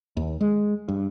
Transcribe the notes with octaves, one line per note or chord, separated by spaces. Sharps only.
D#2
G#3
G2